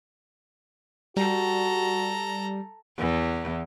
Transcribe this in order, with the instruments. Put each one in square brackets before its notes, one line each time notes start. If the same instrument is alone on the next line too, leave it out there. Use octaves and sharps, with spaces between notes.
[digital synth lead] G3 [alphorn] F#4 [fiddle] A4 A#5
[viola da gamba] E2 E3